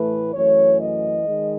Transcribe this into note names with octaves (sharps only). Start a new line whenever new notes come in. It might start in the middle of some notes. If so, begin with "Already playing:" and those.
Already playing: A2 E3 A3 B4
F#2 E3 A3 C#5
D#5
D#3 G#3